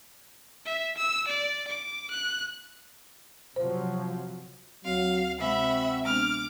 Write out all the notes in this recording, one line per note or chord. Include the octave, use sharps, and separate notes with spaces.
E5
E6
D5
D6
F#6
C3 F3 F#3 C5
D2 F#3 C4 F5
C3 G#3 C4 F#4 E5 B5
G#3 B3 D4 D6 F6